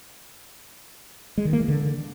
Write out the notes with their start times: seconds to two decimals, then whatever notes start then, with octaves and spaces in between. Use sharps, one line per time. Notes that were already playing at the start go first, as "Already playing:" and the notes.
1.38 G#3
1.45 D#3
1.53 A#3
1.61 E3
1.68 D3